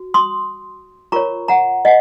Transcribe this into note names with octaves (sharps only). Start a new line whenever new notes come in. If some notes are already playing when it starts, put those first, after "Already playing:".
Already playing: F#4
C6 D#6
F4 A#4 C#5 A#5 C#6
F#5 A#5
D#5 F#5